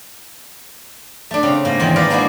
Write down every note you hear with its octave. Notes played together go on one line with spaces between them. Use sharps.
A3 D4
C#3 C4
G#2 A#3
E2 D#3 C4
D#4 A#4 B4 D5 F5 B5
G#3 A#3 D4 E4 F#4 G#4